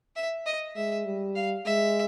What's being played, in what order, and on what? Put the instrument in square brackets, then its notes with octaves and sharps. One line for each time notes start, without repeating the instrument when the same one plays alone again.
[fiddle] E5
D#5
[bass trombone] G#3 [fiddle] E5
[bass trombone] G3
[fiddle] F5
[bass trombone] G#3 [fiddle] E5